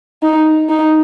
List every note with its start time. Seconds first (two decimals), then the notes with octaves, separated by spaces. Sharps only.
0.23 D#4
0.69 D#4